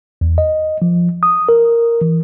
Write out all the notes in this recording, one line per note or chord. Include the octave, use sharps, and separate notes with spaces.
E2
D#5
F3
D#6
A#4
E3